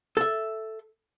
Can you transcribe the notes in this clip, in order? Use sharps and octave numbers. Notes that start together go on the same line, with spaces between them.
A4 E5